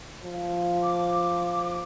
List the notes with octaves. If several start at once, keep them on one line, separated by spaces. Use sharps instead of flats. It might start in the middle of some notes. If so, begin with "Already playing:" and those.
F3
D6